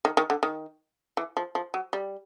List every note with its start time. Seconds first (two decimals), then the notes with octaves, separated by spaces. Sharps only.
0.05 D#3
0.17 D#3
0.30 D3
0.43 D#3
1.17 E3
1.37 F3
1.55 F3
1.74 F#3
1.93 G3